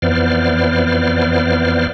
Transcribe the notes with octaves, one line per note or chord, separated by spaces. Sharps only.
F2 E3 B3 C5 D5 F6